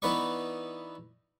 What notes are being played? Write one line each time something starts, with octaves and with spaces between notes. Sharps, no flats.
E3 B3 D#4 B4 D5 C#6